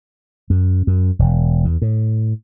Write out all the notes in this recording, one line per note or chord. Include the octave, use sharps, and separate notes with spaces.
F#2
F#2
E1
E2
A2